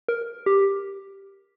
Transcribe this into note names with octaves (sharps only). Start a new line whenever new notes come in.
A#4
G4